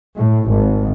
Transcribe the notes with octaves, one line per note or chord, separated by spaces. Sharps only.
A2
G#1